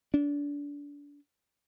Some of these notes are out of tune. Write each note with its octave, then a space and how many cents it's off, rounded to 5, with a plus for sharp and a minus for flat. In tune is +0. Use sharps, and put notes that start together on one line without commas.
D4 -30